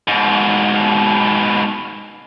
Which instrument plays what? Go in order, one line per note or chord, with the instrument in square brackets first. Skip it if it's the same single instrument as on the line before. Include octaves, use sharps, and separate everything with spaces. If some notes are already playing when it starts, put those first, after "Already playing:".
[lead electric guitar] G#2 B2